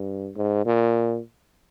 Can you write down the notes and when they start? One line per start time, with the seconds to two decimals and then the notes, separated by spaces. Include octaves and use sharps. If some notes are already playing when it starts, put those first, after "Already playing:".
Already playing: G2
0.36 G#2
0.65 A#2